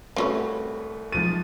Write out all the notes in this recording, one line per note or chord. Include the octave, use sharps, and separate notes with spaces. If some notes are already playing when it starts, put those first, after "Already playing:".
C2 A3 C4 C#4 F#4 B4
G#2 F3 A6 D#7